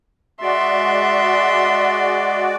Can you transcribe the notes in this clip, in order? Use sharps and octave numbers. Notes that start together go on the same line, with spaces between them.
G#3 F#4 D5 E5 C6